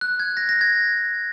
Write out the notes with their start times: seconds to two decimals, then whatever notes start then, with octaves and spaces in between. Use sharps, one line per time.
0.01 F#6
0.20 G#6
0.37 A#6
0.49 A#6
0.61 G#6